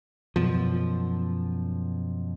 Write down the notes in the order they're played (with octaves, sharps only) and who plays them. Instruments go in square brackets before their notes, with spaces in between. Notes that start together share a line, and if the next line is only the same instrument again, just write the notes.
[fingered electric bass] F#2 B2 F3